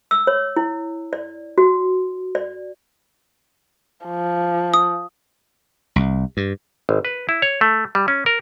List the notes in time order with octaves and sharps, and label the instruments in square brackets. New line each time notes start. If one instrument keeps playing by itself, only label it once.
[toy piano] E6
C#5
E4
D5
F#4
D5
[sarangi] F3
[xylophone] D#6
[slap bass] C2
G2
[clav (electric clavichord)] G#1
B4
E4
C#5
A3
G3
C#4
A#4